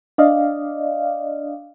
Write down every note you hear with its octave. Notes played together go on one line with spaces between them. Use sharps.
D4 D5 D#5 F5